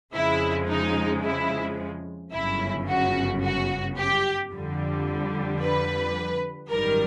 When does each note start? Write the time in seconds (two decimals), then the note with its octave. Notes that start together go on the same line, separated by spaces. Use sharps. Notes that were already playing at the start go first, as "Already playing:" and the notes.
0.14 F2 C#3 F3 G#3 E4
0.69 D#4
1.24 E4
2.33 G1 F#2 C#3 E4
2.88 F#4
3.43 F#4
3.98 G4
4.52 F2 D3 G3
5.61 B4
6.71 G#1 F#2 D#3 G3 A#4